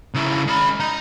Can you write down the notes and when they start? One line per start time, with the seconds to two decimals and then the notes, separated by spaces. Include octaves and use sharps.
0.15 C#3 E4
0.47 G#3 B5
0.80 D#4